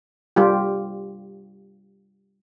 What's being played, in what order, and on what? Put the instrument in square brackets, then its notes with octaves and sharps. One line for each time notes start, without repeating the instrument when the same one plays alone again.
[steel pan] G3 F4 G4